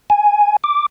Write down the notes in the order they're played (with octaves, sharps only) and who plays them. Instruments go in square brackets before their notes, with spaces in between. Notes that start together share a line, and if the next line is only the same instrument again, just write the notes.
[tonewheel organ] G#5
D6